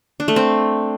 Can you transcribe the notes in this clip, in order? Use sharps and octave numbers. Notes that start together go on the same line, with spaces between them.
D4
A3
C4